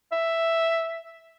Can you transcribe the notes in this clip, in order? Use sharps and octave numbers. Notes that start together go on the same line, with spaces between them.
E5